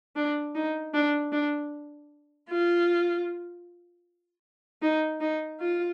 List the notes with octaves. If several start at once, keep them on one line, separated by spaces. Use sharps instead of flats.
D4
D#4
D4
D4
F4
D#4
D#4
F4